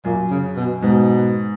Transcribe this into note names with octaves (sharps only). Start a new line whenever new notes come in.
F#2 A#2
C#3
B2
G#2 B2